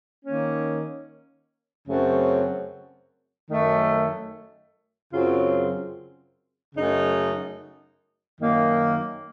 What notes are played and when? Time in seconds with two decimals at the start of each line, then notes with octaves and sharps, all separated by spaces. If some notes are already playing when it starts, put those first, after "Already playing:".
0.24 D#3 A#3 C#4
1.87 F#2 C#3 A3 C4 F#4
3.49 F#2 D#3 A3
5.12 F#2 C#3 F#3 C4 F4
6.75 F#2 C#3 A3 D#4
8.38 F#2 D#3 A#3